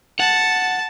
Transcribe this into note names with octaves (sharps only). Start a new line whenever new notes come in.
F#5 A5